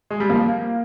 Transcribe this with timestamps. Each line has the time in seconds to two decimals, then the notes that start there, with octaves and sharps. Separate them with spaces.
0.11 G#3
0.20 G3
0.30 F3 A#3